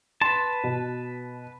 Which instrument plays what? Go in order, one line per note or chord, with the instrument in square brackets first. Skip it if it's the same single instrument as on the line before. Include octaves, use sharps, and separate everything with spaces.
[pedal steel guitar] B4 A5 [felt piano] C6
[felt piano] B2